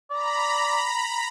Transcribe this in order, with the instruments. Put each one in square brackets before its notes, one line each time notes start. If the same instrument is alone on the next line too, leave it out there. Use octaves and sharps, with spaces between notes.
[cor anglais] D5 [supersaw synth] A#5 B5